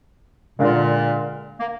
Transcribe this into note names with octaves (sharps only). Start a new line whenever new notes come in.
A#2 D3 G#3 D4 F4 A#4
A#3